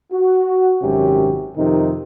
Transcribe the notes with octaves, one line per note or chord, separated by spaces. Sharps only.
F#4
G#1 F#2 C3 C#4 G4
F2 C3 D#3 D#4